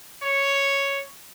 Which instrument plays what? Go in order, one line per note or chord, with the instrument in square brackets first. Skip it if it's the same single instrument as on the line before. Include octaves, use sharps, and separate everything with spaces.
[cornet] C#5